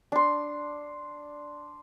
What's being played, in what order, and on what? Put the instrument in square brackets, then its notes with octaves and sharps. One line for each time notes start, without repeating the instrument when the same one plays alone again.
[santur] D4 C6